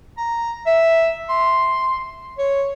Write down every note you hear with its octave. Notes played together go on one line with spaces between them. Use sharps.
A#5
E5
C6
C#5